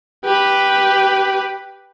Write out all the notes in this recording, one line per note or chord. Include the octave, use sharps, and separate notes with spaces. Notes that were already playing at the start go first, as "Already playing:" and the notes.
G4 B4